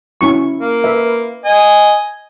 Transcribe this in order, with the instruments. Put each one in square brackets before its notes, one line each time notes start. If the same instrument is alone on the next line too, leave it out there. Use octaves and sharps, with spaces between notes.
[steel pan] C#4 E4 C#6
[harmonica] A#3
[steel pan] B4 E5
[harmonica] D#5 G#5